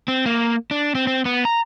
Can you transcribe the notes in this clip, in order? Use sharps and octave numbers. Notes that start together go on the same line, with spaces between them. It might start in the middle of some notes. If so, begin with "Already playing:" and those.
C4
A#3
D4
C4
C4
B3
A#5